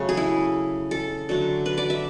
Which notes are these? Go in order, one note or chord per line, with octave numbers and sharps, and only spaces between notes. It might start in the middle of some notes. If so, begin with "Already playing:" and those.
Already playing: C#3 F#3 A3 C#4
G#4
E4
A4
D3 F#3 A3
B4
D5
E5